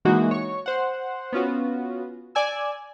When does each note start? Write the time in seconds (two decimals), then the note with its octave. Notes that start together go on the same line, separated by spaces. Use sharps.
0.05 E3 G#3 A#3 D#4 F#4
0.31 C#5 C#6
0.66 C5 F#5
1.33 B3 C#4 F4 F#4
2.35 D5 G#5 E6